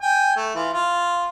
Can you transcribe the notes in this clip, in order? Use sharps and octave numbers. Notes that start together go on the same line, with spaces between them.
G5 G#5
A3
E3 F4
F4